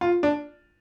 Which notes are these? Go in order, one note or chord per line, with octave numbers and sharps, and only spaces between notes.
F4
D4